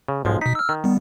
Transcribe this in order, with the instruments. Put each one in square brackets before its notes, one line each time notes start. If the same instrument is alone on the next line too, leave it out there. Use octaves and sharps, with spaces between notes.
[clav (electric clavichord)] C#3
[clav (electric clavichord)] B1 F3 G#3 [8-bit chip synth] G#2
[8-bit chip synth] B2 B6 [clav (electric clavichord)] D#4
[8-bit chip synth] E6 F6
[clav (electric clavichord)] D#3
[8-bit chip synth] G3 B3